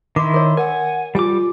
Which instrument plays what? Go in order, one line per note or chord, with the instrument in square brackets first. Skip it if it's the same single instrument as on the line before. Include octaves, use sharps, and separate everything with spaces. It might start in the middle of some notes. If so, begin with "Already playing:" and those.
[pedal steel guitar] D#3 E4 [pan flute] C6 [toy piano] D6
[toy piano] A#4 C#5
[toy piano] A#4 [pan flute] F#5 [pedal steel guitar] G#5
[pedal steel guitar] G3 D6 [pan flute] F4 [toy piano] G4 G#5